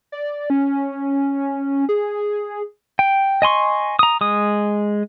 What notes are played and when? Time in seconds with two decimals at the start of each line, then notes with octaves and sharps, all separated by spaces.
0.12 D5
0.50 C#4
1.89 G#4
2.99 G5
3.42 D#5 G#5 C6 C#6
3.99 A#5 D#6
4.21 G#3 D#6